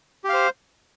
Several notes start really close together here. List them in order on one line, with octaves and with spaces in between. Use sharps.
G4 F5 C5